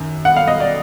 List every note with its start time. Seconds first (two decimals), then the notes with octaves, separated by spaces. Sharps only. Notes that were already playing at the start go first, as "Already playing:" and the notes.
Already playing: F#2 D#3
0.25 F#5
0.36 F5
0.48 D#5
0.60 D5